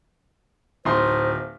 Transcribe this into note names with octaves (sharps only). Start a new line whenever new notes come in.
D1 D#4 C5 C6